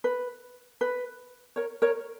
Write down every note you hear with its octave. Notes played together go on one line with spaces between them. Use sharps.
B4
B4
A#4 C#5
A#4 C#5